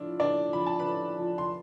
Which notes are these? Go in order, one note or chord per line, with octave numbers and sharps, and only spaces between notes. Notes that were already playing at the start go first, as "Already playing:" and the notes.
Already playing: A2 F3 D4 E4 F4
A2 D4 D5
F3 B5
A5
B4 B5
A2
F3
C6